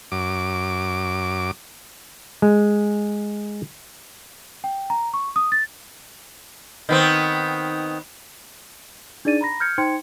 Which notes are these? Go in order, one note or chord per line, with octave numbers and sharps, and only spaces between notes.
F#2 D6
G#3
G5
A#5
C#6
D#6
A6
D#3 B3 C4
D4 D#4 G#4 D5 A6 D#7
A#5 B5 A#6
F6 G6 G#6 C#7
D#4 C5 G5 C6 G#6 C#7